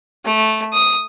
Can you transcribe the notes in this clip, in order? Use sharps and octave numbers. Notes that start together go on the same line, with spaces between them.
A3
D#6